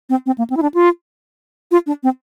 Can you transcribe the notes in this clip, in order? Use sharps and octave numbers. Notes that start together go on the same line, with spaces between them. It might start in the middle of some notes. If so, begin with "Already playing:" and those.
C4
C4
A#3
C4
E4
D4
F4
F4
D4
C4